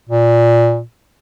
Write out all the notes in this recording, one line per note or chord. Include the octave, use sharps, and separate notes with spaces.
A#2